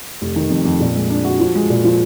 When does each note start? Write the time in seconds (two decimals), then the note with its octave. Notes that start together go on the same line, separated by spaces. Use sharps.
0.21 F1
0.36 D#3
0.50 F2
0.65 F2
0.80 A#2
0.95 G#3
1.10 D4
1.25 F#4
1.39 F3
1.55 G#3
1.70 A#2
1.84 F3